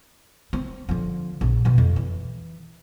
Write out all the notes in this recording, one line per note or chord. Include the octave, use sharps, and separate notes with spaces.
C4
D3 F3
A#1
B2 F3
F2
E3